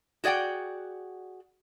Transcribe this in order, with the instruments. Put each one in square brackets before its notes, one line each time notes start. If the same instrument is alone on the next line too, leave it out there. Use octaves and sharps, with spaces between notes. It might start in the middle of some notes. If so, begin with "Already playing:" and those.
[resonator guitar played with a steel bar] F#4 G#4 D5 F#5 G5